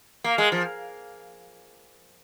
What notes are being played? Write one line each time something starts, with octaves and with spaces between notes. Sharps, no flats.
A#3
G#3
F3